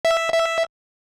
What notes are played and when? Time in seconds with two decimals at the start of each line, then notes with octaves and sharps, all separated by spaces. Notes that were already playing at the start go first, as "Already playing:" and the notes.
0.05 E5
0.33 E5